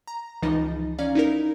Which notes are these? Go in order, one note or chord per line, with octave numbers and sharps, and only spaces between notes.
A#5
C#2 E3 F3 D#4 D#5 A6
C#4 D5 F5 A#5
D#4 E4 A#4